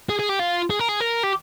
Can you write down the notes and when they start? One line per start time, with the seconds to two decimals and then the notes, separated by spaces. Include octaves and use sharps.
0.09 G#4
0.19 G#4
0.29 G4
0.40 F4
0.70 G#4
0.79 A#4
0.89 G#4
1.00 A#4
1.23 G4